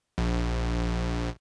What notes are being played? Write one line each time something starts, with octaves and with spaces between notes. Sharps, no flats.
A#1